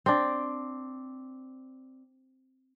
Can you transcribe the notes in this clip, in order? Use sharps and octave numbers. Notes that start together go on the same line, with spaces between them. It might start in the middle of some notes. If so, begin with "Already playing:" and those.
C4 D4